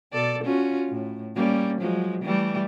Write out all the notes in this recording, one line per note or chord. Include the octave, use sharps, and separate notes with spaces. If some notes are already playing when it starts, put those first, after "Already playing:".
B2 A4 D5
C#4 F4 F#4
A2
G3 A#3 C#4
F3 F#3 G#3
E3 G3 A3